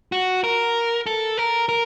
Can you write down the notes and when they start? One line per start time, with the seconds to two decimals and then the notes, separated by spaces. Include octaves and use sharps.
0.12 F#4
0.44 A#4
1.07 A4
1.37 A#4
1.69 A#4